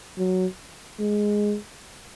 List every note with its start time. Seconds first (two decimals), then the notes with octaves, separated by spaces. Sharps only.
0.18 F#3
0.99 G#3